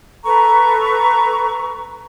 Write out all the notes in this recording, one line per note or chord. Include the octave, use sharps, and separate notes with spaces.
A4 B4 A#5 C#6